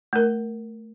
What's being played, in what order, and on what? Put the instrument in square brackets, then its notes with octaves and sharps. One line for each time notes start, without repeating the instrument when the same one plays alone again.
[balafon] A3 A#4